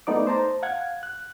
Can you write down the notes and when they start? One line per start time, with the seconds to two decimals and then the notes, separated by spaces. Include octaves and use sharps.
0.07 A3 B3 D#4 D5 D6
0.27 C5 A5 A#5
0.63 F5 F#5 G#6
1.03 F#6